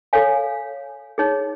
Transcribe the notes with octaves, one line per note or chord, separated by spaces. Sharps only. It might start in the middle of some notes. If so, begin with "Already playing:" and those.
A4 C#5 F5 G#5
D#4 G#4 C#5